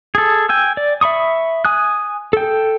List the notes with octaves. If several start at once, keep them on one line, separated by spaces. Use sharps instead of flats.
G#4 A4
G5 G#5 E6
D5
E5 B5 C#6 D#6
G#5 D#6 F#6
A4 G5